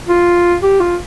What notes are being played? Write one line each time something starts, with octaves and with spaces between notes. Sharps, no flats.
F4
G4
F4